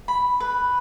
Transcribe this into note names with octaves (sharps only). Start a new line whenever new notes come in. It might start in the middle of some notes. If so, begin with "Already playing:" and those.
B5
B4